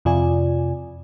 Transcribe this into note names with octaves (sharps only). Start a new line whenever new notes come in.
F2 C3 F4 D5 G#5